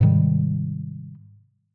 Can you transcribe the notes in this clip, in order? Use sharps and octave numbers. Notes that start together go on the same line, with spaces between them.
G#2 C3 D#3 G3